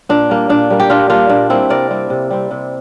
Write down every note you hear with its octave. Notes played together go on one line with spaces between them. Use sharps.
A#2 D4
G3 A#3
A#2 D4
G3 A#3
G4
A#2 D4 F4
G3 A#3 D4 F4
A#2 D4
G3 A#3 C4 E4
C3 A#4 D5
G3 C4
C3
G3 C4
C3